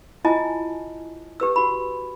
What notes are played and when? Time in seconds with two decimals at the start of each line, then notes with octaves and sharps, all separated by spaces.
0.25 E4 F4 D#5 G#5 A5
1.40 G4 B4 E6
1.56 F#4 B5